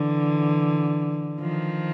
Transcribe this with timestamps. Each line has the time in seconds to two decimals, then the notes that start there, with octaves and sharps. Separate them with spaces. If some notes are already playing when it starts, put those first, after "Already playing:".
Already playing: D3 E3
1.40 D#3 F3